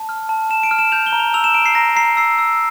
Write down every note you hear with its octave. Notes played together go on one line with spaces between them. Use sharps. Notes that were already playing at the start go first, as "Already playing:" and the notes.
Already playing: A5
F6
A5
A5 E7
D7
F6
E7
G6 F7
G7
A#5
F7
E6 F7
E7
A#5 D7
C7
A#5 A#6
A#5 C7
E6 C7
E6